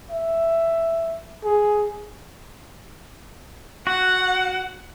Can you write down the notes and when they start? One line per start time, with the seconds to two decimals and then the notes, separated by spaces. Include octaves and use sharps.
0.10 E5
1.44 G#4
3.87 F#4 F#5